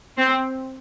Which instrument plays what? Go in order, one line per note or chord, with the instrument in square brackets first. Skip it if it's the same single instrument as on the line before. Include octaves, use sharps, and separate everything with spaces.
[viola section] C4